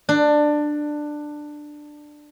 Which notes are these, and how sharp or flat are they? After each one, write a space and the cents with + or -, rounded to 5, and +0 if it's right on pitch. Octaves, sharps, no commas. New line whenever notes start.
D4 +15